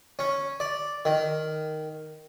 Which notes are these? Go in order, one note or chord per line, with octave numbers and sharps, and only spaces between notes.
C#4
D5
D#3